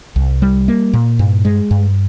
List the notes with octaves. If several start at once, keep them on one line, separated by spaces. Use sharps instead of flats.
C2
G3
A#3
A#2
G2
G#3
G2